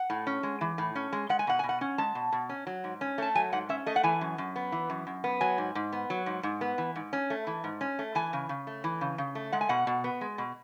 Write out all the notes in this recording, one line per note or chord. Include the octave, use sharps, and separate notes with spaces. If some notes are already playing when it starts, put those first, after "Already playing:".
Already playing: F#5
A2
C#4
G#3
E3
A2
C#4
G#3
G#3 F#5
G#5
B2 F#5
G#5
B2
F#5
C#4
G#3 A5
B2
B2
C#4
F#3
G#2
C#4
A3 A5
F#3 G#5
G#2 F#5
C#4 E5
A3 D#5
F#5
E3 G#5
F#2
F#2
B3
E3
F#2
F#2
B3
F#3 G#5
G#2
G#2
B3
F#3
G#2
G#2
B3
E3
G#2
C#4
A3
E3
G#2
C#4
A3
E3 G#5
C#3
C#3
A3
E3
C#3
C#3
A3
G#3 F#5
G#5
B2 F#5
B2
B3
G#3
B2